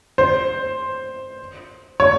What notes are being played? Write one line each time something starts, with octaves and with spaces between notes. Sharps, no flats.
C5
C#5